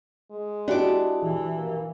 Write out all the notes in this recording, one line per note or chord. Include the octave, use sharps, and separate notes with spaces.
G#3
D4 E4 F#4 G4 D6
E3
A#3